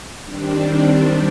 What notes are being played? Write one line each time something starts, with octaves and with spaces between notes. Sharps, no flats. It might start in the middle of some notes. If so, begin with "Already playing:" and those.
D#3 G3 C4 D4